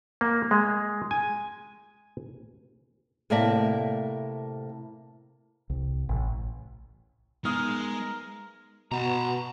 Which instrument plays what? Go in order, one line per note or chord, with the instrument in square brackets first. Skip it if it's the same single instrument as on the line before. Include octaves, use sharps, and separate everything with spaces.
[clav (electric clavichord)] A#3
G#3
G#5
[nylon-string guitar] A2 C3 A#3 D5 E5 A5
[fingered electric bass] C2
A1
[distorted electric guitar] G#3 [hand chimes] B3 D#4 G#4 [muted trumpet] A#4 [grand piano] D#6 F6 F7
[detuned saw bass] B2 [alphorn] F#4 [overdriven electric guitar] A5 A#5